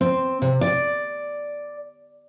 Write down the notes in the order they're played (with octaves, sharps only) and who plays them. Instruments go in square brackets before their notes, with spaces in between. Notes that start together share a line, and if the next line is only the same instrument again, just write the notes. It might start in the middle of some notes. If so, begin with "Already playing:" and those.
[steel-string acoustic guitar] C4
C3
D5